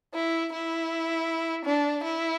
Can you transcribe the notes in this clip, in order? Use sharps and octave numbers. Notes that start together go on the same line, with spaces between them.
E4
E4
D4
E4